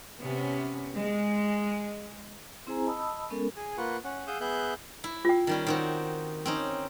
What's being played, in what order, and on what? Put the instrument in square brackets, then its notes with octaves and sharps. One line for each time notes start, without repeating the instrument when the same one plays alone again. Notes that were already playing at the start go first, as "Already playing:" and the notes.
[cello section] C3 B3 C#4
G#3
[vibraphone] C4 E4 G#4 C5 G#5 A#5
D#5 A5 B5 D#6 E6
G#3 B3 C#4 A4 A#4
[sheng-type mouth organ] G#4 G#5
A#3 F4 B4 F#5 C#6
C#4 F#5
G#4 F5 F#5 D#6 E6 G6
B3 G#4 E5 F#6 G6
[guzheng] E4
[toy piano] F4 G5
[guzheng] D#3 G3 C#4
D#3 C4 F#4
C4 C#4 D#4